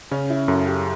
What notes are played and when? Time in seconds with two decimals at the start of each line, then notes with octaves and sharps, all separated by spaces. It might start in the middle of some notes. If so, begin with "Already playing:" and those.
0.11 C#3 C#4
0.30 E4
0.48 F#2 A4
0.67 G4